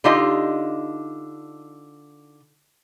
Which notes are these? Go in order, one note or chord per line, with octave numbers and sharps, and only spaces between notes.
D3 D#4 F4 G4 D#5